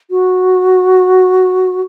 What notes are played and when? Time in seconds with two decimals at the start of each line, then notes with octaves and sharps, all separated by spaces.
0.11 F#4